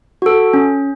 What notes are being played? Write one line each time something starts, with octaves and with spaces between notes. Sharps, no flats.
F#4 A4
C#4